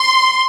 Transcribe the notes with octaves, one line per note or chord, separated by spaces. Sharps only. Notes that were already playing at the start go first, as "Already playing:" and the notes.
Already playing: C6